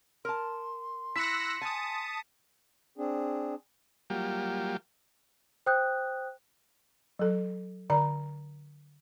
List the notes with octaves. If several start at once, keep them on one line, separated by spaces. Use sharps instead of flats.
A#4 A5 C6
E4 E6 F#6 A#6 B6 C#7
G#5 A5 D#6
C4 D4 G#4
F#3 G3 A#3 F4 G4
C5 G5 D#6 F#6 G6
F#3 A4
D3 D5 A#5